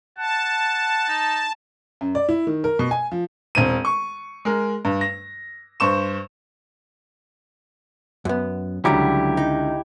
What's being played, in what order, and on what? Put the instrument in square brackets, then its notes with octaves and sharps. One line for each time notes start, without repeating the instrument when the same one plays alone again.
[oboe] F#5 [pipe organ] A5
[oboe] D#4
[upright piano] F#2
D5
E4
D#3
A#4
B2
G#5
F3
E1 C4 D#7
C#6
G#3 A#4
G2
A#6
G2 C5 C#6 E7
[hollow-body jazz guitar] F#2 B3
[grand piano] C#2 D3 A#5 [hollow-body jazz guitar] F#3 G3 [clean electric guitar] E4 G4
[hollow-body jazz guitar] D#4